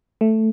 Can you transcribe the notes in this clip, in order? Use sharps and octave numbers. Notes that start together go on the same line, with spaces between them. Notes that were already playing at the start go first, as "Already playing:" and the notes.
A3